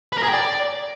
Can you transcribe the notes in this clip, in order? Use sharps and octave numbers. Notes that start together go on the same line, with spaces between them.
B4
A#4
G#4
G5
D5